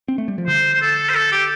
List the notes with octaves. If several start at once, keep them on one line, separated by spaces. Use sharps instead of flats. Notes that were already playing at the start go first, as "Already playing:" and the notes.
C4
A3
G3
F3
D3 C5
C5
A4
C5
A4
G4